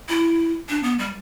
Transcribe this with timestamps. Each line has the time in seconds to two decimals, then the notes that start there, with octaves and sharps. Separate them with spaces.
0.09 E4
0.69 D4
0.83 B3
0.99 G3